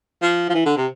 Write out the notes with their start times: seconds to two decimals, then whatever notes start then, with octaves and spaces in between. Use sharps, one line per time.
0.22 F3
0.49 F3
0.54 E3
0.65 D3
0.77 C3